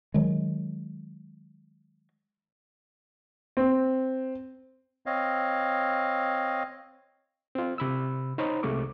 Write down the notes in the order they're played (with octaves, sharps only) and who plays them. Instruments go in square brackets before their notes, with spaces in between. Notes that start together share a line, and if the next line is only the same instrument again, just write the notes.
[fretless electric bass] D#3 F#3 G#3
[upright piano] C4
[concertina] C4 C#5 D#5 F5
[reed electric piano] C4 F4
C3 B5 E6
D#4 C5 C#5 A#5 B5
C2 C3 G#3 A3 C#6 D6